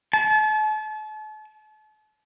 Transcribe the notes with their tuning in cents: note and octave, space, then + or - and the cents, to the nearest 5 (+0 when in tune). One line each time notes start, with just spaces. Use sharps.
A5 -40